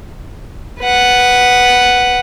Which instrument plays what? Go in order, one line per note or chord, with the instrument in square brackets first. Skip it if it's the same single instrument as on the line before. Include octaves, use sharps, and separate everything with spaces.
[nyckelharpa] B4 F#5